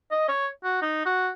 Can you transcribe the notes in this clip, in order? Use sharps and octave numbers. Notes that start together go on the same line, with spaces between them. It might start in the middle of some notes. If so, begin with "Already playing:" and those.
D#5
C#5
F#4
D#4
F#4